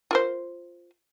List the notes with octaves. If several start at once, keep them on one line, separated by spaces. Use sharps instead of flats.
F4 A#4 C5